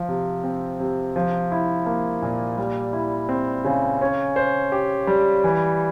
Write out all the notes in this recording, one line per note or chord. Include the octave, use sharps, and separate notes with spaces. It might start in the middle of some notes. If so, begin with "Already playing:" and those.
Already playing: F3
C3
C4
C3
F3
E4
A#3
A#2
G3
E4
C4
C#3
C#4
C5
G4
G3
E3